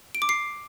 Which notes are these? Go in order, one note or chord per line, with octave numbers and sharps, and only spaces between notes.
D7
D6
C7